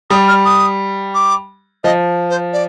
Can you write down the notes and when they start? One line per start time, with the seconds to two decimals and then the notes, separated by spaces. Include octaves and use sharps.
0.10 G3 D#6
0.28 F6
0.45 D#6
1.14 D6
1.84 F3 D#5
2.30 C5
2.53 D5